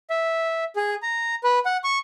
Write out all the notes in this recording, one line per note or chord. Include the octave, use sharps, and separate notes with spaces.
E5
G#4
A#5
B4
F#5
C#6